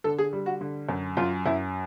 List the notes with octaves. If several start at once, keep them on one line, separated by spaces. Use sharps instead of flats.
D3 A4
G#4
G3
F#4
D3
F#2
F#2 F4
F#2 E4